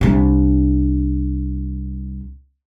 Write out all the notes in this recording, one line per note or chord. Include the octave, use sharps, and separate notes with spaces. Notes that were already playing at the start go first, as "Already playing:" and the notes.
C2 D4